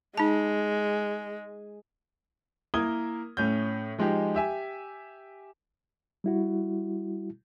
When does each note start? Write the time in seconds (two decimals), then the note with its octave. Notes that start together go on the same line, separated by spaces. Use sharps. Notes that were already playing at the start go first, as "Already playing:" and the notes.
0.17 G#3 D#4 A5
2.74 A#3 E4 A#4 D#6 G#6 G7
3.37 A2 C#4 G6
3.99 F3 G#3 D#4 G4
4.35 G4 E5 G#5
6.24 G3 E4 F#4